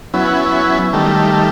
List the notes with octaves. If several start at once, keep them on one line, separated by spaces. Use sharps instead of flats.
F#3 B3 C#4 E4
D#3 G3 A3